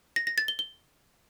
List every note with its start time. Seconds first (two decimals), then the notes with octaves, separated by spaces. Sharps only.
0.16 A#6
0.27 A#6
0.38 A6
0.48 G7
0.59 G7